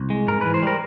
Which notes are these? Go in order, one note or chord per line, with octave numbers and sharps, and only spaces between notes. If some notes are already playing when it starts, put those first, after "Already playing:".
Already playing: C2
G#3
G#2 A#4
E3 B4
C5
G3 A#4